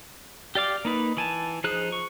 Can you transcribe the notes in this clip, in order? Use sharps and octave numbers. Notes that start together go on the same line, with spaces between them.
G4 D5 F5 D6
A#3 D#4 B4
E3 G#5 A5
F3 D#4 G#4 C5 F#6
C#6